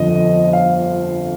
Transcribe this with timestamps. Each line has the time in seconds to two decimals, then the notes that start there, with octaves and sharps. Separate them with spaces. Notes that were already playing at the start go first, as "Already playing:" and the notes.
Already playing: G1 F2 D3 F3 D#5
0.53 F5